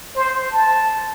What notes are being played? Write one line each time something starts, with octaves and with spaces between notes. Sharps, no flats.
C5
A5